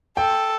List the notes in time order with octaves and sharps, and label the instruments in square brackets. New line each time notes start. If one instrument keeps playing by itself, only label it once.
[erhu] A4 [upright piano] G5